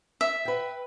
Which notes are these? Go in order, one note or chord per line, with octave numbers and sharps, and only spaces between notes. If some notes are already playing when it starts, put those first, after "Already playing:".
E5
B4 G5